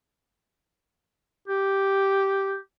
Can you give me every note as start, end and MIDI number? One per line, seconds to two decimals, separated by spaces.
1.48 2.56 67